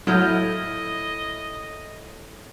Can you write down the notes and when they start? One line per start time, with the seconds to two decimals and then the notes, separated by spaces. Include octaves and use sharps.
0.07 A2 F#3 E4 F4 D#5 F6 G6